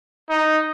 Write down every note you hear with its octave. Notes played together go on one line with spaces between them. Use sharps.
D#4